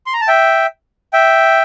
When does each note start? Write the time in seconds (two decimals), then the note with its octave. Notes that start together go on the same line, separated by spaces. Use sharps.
0.06 C6
0.13 A#5
0.21 A5
0.28 E5 G5
1.13 E5 G5